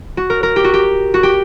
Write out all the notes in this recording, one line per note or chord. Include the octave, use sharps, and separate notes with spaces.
F#4
A#4
A#4
G4
F#4
G4
F#4
G4